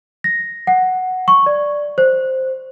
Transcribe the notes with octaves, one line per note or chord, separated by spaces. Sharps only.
A#6
F#5
C#6
D5
C5